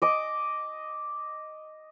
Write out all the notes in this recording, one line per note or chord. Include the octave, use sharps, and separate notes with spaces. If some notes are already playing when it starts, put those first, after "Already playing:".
D#5 D6